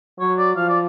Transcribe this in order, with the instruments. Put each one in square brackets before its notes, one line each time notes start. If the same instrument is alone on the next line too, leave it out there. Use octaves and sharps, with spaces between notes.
[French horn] F#3 [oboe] C#5
[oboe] D5
[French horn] F3 [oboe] F5
[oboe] D5